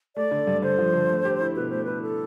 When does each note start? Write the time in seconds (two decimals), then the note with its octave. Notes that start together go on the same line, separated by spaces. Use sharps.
0.16 A3 D5
0.31 D3
0.47 G2
0.62 D3 C5
0.79 F3
0.93 D3
1.10 A3
1.25 G4
1.41 E4
1.56 B2 B4
1.70 A3 C5
1.84 E4 B4
2.02 A4